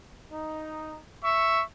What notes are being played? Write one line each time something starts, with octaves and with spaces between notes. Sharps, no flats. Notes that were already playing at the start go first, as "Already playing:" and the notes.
D#4
E5 C#6